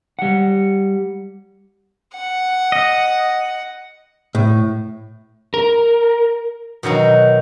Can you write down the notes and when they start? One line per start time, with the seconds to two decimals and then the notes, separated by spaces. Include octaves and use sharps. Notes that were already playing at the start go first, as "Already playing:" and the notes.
0.19 G3 F#5
2.15 F#5
2.72 D#5
4.35 A2
5.54 A#4
6.83 B2 D#3 F#3 D#4